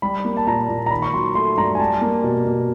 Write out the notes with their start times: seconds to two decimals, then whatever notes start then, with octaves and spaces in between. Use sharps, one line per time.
0.02 G3 B5
0.25 A#3
0.37 A5
0.47 A#2 A#5
0.69 A#2
0.86 A#5
0.91 D#3 B5
1.02 C#6
1.13 F#3 C6
1.35 A3 C6
1.57 G2 A#5
1.75 G#5
1.79 G3 A5
2.01 A#3
2.24 B2
2.46 B2